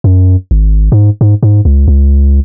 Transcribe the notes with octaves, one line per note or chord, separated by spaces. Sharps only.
F#2
G#1
G#2
G#2
G#2
C#2
C#2